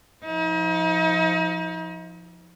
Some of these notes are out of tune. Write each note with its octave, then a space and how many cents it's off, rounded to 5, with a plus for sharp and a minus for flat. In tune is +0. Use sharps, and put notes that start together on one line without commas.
F3 +0 D#4 +40